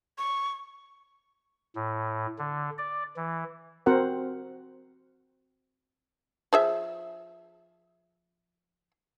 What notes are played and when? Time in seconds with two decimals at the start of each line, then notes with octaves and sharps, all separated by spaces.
0.18 C#6
1.76 A2
2.38 D3
2.78 D5
3.16 E3
3.86 C4 F#4 A#4 C5 F#5
6.53 F3 G#4 E5